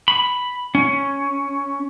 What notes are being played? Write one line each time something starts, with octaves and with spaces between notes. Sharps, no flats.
B5
C#4